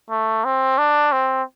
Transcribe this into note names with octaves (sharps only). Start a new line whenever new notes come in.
A3
C4
D4
C4